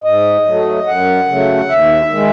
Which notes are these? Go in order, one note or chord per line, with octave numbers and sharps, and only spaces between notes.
G#2 D#5
F#3 A3
F#2 F#5
C#3 F#3 A3
D#2 E5
D#3 G#3